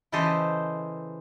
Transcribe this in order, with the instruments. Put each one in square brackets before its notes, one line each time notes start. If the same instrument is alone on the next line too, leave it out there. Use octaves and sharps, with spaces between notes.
[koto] C#3 E3 G4 A4 C5 D#5